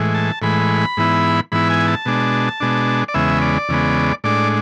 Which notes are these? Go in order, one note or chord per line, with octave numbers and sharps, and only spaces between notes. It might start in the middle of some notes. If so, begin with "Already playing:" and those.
Already playing: A2 E3 G#3
A5
A2 E3 G#3 B5
G#2 E3 B3 E4
G#2 E3 B3 E4 B5
G#5
A5
B2 G#3 D4
B2 G#3 D4
D5
E2 C#3 G#3 B3 E5
D5
E2 C#3 G#3 B3
A2 G#3 D4 D5